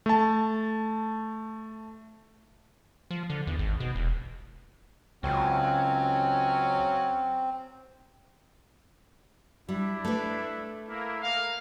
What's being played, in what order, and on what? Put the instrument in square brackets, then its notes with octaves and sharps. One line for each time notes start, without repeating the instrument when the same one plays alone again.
[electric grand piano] A3 A5
[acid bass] F3
D3
E2
G#1
B2
E1
[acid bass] C#2 [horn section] F#3 C#4 [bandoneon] C4
[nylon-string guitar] G3 [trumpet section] D4 E4
[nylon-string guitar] A3 B4
[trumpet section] A#3 E4
A#3 F5